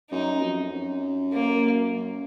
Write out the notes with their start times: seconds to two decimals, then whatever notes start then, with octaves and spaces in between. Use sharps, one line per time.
0.11 F#2 D#4
0.42 F2
0.72 F#2
1.32 A#3
1.93 F#2